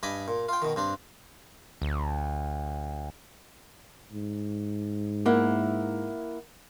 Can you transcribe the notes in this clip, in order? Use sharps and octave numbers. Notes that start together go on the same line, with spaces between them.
G2 D#5 G#5 B5 D6
A#2
F4 G5
B2 D#3
G2 C4 D4
D2
G#2
A#3 E4 F#5